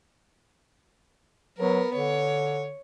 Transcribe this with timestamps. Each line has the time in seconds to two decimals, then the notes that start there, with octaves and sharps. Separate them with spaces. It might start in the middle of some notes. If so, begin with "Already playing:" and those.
1.59 F#3 B3 A#4
1.95 D3 C#5